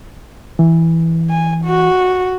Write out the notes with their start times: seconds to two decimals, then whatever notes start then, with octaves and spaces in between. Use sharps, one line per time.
0.59 E3
1.30 G#5
1.65 F#4